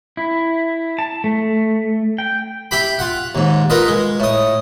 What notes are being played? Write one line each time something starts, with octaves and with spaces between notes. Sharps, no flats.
E4
A5
A3
G5
E4 G4 G5 B5
F4 F#5
D#2 G#2
F4 A#4 B4 D#5
G#3
A2 D#6